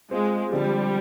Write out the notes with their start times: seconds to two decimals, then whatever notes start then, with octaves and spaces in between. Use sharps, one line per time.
0.11 G#3 C4 F4 G#4
0.51 D3 F3 G3 C4 G4 D5